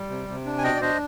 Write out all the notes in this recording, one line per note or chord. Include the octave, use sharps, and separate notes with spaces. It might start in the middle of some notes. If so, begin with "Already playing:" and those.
Already playing: G3
C3
C3
D4
G#5
B2 D#5 G5
D5
D4 C5 D#5